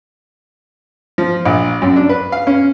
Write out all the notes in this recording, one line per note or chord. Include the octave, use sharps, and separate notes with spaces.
F3
A#1
F#2
D4
B4
F5
C#4